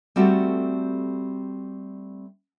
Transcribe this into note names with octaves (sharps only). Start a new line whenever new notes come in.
G3 A3 C4 F#4 G4 A4